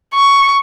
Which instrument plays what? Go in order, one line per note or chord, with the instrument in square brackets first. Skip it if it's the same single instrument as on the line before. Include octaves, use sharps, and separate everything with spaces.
[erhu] C#6